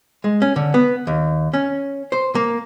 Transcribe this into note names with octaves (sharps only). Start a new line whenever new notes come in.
G#3
C#4
D3
B3
D#2
C#4
C5
A#3